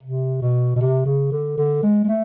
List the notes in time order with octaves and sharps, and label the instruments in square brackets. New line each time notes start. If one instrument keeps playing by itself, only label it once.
[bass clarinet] C3
B2
B2
C3
C#3
D3
D3
G#3
G#3
A3